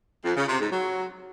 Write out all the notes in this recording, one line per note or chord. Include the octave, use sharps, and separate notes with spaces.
F2
C#3
C3
G#2
F#3